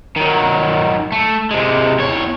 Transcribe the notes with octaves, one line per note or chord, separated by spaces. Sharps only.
D#3 F#3
A3
C3 G#3
E2 C#5